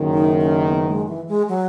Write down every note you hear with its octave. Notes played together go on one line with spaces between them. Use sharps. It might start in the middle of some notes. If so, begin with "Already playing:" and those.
Already playing: F#1 F#2 D#3
D#4
C#4
B3
G#3
E3
G#3
F#3